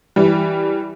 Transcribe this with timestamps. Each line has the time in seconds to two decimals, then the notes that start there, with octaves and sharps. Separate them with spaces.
0.16 E3 G3